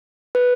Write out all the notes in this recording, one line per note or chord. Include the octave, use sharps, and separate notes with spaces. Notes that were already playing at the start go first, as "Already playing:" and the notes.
B4